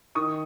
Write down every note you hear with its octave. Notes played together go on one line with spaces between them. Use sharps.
D#3 C#6 D#6